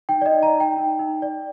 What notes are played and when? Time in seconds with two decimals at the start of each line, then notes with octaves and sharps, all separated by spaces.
0.09 D#4 G5
0.21 D5
0.26 D#5
0.32 D#4
0.43 A#5
0.54 D#4
0.60 G5
0.77 D#4
0.99 D#4
1.22 D5